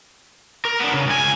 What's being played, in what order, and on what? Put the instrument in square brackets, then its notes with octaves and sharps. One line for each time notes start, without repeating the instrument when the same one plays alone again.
[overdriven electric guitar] A#4
B3 D4
C#3
C#2 G#5